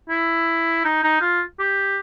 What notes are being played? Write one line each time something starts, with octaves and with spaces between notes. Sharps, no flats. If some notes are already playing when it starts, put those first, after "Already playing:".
E4
D#4
D#4
F4
G4